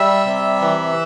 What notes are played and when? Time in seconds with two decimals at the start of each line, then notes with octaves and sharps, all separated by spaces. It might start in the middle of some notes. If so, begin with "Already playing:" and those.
Already playing: G3 E5
0.26 C3
0.61 E3